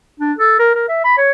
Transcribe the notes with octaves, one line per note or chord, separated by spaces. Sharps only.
D4
A4
A#4
A#4
E5
B5
C#5